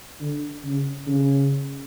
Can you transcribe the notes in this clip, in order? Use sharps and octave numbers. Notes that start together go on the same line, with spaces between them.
D3
C#3
C#3